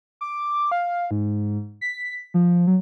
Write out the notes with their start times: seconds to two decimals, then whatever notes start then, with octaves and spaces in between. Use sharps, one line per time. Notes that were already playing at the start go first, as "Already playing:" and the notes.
0.21 D6
0.72 F5
1.11 G#2
1.81 B6
2.34 F3
2.67 F#3